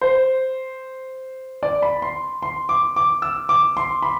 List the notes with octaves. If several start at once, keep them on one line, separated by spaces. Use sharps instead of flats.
C5
D5
B5
C6
C6
D6
D6
E6
D6
C6
B5